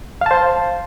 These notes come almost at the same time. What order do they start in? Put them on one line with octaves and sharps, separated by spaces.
F5 A5 C5